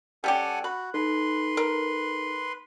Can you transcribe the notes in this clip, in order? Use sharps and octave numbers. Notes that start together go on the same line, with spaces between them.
G3 C#4 G4 A4 F#5 G#5
F#4 B5 F#6
D#4 A4 B4 C6
A#4